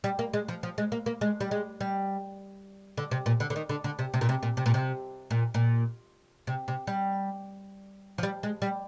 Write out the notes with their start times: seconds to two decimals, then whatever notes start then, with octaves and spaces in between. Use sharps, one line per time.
0.04 G3
0.19 A#3
0.33 G#3
0.48 F3
0.63 F3
0.78 G#3
0.92 A#3
1.06 A#3
1.21 G#3
1.41 G3
1.51 G#3
1.81 G3
2.97 D3
3.11 C3
3.26 A#2
3.40 D3
3.50 D3
3.56 D#3
3.69 D3
3.84 D3
3.99 C3
4.14 C3
4.21 A#2
4.29 C3
4.43 A#2
4.57 C3
4.66 A#2
4.74 C3
5.31 A#2
5.54 A#2
6.47 C3
6.68 C3
6.87 G3
8.18 F3
8.23 G3
8.43 G#3
8.62 G3